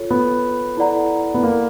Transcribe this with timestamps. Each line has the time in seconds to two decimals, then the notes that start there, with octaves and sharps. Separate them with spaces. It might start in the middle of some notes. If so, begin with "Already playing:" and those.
Already playing: F4 A4 C#5
0.10 B3
0.77 E4 A4 D5 F#5 A#5
1.34 B3
1.43 A#3